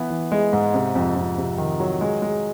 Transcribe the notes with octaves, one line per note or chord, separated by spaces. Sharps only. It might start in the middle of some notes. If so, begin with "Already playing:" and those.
Already playing: E3 B3
E3
G#3
G#2
C3
F2
F2
C3
D#3
F#3
G#3
G#3